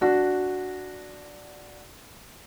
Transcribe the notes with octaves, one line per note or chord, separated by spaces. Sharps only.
D4 F#4